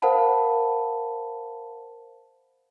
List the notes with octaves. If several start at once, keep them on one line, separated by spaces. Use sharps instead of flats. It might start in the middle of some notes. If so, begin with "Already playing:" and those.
A#4 C5 F5 F#5 A5 B5